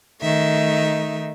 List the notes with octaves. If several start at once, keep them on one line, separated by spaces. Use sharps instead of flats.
D#3 A3 D#4 E5